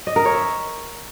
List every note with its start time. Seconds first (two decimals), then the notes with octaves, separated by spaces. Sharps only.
0.07 D#5
0.16 A#4
0.25 C#5
0.34 E5